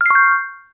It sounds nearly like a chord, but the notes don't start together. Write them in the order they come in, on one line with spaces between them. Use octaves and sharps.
F6 C7 C#6 G6